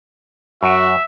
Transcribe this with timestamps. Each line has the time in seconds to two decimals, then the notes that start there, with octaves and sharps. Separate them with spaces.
0.63 F#2 F#4 E5